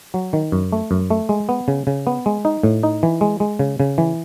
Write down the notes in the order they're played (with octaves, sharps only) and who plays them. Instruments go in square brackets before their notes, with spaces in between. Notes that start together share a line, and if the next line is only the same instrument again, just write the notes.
[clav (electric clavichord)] F#3
D#3
F#2
A3
F#2
A3
G#3
B3
C#3
C#3
B3
G#3
D#4
A2
D#4
E3
G#3
G#3
C#3
C#3
E3